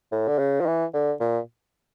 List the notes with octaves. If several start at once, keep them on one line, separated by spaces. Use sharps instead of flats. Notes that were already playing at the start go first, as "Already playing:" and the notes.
A2
D3
C#3
F3
E3
D3
A#2